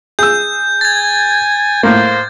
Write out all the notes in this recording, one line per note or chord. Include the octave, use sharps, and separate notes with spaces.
G#4 E6 G6
G#5 G#6 A6
A2 A#3 C5